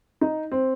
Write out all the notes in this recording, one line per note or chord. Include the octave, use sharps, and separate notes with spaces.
D#4
C4